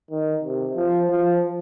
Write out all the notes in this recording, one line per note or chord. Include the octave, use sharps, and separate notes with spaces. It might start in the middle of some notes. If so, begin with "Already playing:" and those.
D#3
C3
F3
F3